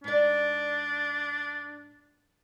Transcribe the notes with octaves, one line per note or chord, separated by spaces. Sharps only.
G#2 D4 D5